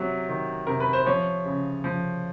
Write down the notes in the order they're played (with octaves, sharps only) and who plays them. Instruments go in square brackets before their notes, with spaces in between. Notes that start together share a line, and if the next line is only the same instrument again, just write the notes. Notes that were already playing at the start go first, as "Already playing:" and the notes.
Already playing: [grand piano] C3 F#3
D#3
C3 A#4
B4
C5
F3 C#5
C#3
F3